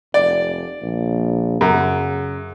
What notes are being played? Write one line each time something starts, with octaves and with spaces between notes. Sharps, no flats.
F1 D5
A#1
F#2 C#3